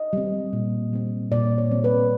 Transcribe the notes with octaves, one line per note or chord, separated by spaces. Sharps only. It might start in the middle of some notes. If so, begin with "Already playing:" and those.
Already playing: D#5
G3 C4
A#2
G3 C4
A#2 D5
C#5
G3 C4
B4